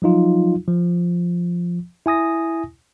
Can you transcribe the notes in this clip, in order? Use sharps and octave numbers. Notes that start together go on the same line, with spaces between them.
F3 F#3 D#4 F4
F3
E4 G#5 D#6 A#6